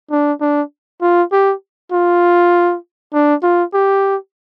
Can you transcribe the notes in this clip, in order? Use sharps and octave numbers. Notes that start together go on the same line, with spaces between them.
D4
D4
F4
G4
F4
D4
F4
G4